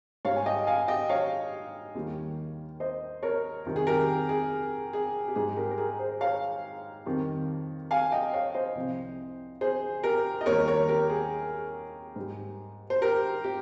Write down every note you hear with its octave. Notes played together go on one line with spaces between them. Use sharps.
G#2 G3 C#5 F5
G#5
D#5 G5
F5 G#5
D#5 G5
C#5 F5
D#2 D#3 G3
C5 D#5
A#4 C#5
F2 C3 D#3 G3
G#4
G4 A#4
G#4
G#4
G4
G#2 G3 G#4
G4 A#4
A#4
G#4
G#4 C5
C#5 F5
F2 D#3 G3
F5 G#5
D#5 G5
C#5 F5
C5 D#5
C2 C3 F3
G#4 C5
G4 A#4
D#5
D#2 D#3 G3 A#4 C#5
A#4 C#5
G4 A#4
G#4
G#2 G3
C5
G4 A#4
G4